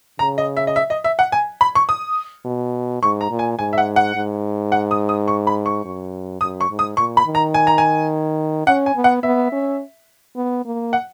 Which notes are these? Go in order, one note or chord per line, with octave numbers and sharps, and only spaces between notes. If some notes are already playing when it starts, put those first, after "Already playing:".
C#3 A#5
D#5
E5
D#5
E5
D#5
E5
F#5
G#5
B5
C#6
D#6
B2
G#2 C#6
A#5
A#2
G#5
G#2 G#5
E5
F#5
F#5
G#2
F#5
D#6
D#6
C#6
B5
C#6
F#2
F#2 D#6
C#6
G#2
D#6
A#2 C#6
B5
D#3
A#5
G#5
A#5
G#5
C#4 F#5
G#5
B3
F#5
B3 E5
C#4
B3
A#3
F#5